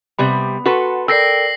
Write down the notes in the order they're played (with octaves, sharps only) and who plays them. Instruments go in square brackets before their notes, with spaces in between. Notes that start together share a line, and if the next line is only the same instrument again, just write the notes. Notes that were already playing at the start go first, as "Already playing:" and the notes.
[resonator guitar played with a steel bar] C3 G3 B3 [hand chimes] B5
[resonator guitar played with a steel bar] F#4 A4 B4 [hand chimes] F#5 C6
[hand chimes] A4 A#4 D5 [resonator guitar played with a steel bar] G5 [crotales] E6 A#6 C7